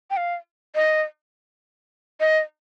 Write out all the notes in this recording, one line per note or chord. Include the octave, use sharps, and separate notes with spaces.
G5
F5
D#5
D#5